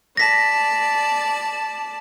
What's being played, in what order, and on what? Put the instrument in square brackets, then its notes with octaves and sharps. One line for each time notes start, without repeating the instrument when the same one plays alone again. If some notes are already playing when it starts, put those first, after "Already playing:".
[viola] D5 A5 [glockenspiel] A#6 B6